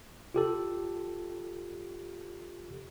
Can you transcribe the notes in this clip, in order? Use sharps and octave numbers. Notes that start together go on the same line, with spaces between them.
F4 G4 A4